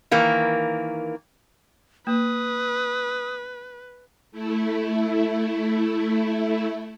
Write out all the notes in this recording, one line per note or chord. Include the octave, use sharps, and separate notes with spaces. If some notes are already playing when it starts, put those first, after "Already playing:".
D#3 E3 A#3
A#3 B4 D#6
A3 E4